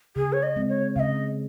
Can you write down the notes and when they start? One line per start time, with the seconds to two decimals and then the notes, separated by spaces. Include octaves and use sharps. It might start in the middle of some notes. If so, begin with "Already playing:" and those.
0.16 C#3 G#4
0.33 C#5
0.43 D#5
0.56 G#3 C4
0.69 C#5
0.95 C#3 D#5 F5